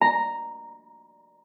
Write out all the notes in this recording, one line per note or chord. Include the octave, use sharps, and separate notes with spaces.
A#5